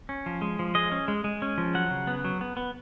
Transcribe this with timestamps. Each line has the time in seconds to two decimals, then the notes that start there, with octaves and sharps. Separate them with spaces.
0.09 C#4
0.26 F3
0.42 G#3
0.59 F3
0.75 G#3 D#5
0.92 C#4
1.08 G#3
1.24 G#3
1.42 C#4
1.58 F3
1.74 F#3 F#5
1.91 C#3
2.07 B3
2.25 F#3
2.41 B3
2.57 B3